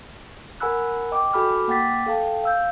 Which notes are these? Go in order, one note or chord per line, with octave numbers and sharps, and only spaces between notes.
A#4 F#5 G#5 B5 E6 F#6
D#5 G5 D6
F#4 A4 G#5 B5 D6 F6
A#3 F#5 G5 D6 A6 B6
A4 F5 G5 A5
F5 E6 G6